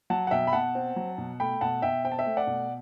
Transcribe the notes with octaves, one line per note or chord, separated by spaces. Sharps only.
F#3 F#5 A5
F#5
B2 E5 G5
B5
B2 F#5 A5
C4
F#3
B2
A3 G5 B5
B2 F#5 A5
B2 E5 G5
C4 G5
A5
E5 G5
A3
D5 F#5
B2